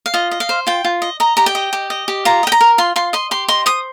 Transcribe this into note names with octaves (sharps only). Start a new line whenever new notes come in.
F5
F4 D#5
D#5
F5
C5
F4 G5
F4
D#5
D#5 A#5
G4 A#5
G5
D#5
G4
D#5
G4
F4 A#5
D#5 G5
A#5
A#4
F4 C6
F4 C6
D#5 C6
G4 C6
D#5 C6
C5 D#6